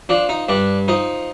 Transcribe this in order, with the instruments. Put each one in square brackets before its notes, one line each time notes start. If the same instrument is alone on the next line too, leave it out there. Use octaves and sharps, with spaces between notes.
[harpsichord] F3 D4
D#4
G2 D4
F3 D#4